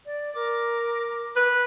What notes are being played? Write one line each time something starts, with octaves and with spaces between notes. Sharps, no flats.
D5
A#4 D6
B4